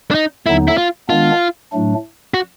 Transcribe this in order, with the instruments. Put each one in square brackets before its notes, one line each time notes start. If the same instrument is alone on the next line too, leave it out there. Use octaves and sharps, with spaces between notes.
[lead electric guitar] D4
D#4
[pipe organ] D#2 D3 F#3 B3 D#4 [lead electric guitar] E4
[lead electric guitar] E4
F4
[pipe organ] D#3 G#3 B3 D4 [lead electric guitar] F4
[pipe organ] A2 F#3 A3 D4
[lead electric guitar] F#4